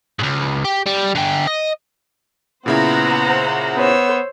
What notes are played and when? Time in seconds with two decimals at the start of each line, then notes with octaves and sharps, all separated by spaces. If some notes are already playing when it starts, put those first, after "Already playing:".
0.19 C#2 G#2
0.65 G4
0.86 G3
1.15 D3 G4
1.47 D#5
2.66 A#2 C#3 B3 E4 C5 F#5 A#5
3.76 B3 C5 C#5 E6